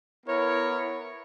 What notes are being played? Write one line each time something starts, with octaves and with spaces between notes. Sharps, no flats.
B3 E4 A#4 C#5